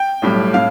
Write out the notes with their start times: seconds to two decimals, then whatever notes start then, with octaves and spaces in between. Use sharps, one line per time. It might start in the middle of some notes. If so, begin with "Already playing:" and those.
Already playing: G5
0.22 B1 A2 G3
0.54 A2 F5